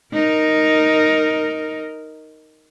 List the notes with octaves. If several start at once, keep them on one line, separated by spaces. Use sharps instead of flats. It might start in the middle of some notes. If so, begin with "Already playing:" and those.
D#4 A#4